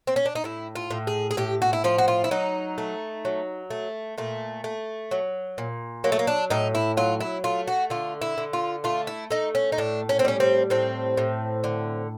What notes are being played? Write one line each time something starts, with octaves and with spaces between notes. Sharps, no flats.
C4
C#4
D4
D#4
A2 E4
F4
A2
G#4
G#4
A2 G4
F#4
E4
F3 F4
F#4
F4
E4
F#3 D#4
A3
F#3
A3
A#2 A3
A3
F#3
A#2
F#3 A#3
A3
A#3
D4
A2 D#4
E4
F#3 F4
E4
A3 F4
F#4
D3 F4
E4
D3
F4
A3 F4
E4
A3 D#4
C#4
D#4
A2 D4
C#4
C4
G3 C#4
C4
A2 C4
A2
D3